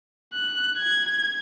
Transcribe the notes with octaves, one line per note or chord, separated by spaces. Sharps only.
F#6
G#6